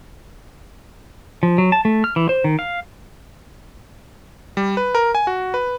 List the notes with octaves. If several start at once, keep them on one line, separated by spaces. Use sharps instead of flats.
F3
F#3
A5
A3
F6
E3
C5
D#3
F5
G3
B4
A#4
G#5
F#4
B4